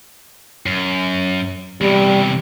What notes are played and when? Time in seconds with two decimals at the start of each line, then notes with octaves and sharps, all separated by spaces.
0.66 F#2
1.81 E2 C3 G3